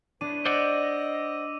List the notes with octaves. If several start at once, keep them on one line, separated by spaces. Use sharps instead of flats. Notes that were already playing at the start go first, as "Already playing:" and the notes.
A3 D4 G#4 B4 D#7
C5 D5 D#5 F#5 D6 E6 D#7